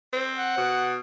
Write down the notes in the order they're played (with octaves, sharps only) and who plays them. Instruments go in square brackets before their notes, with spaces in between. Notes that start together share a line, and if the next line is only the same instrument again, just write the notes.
[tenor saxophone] C4
[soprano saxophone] F#5
[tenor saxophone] B2